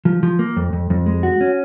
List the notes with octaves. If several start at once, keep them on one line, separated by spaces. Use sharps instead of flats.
F3
F3
A#3
F2
F2
F2
G#3
F#4
C#4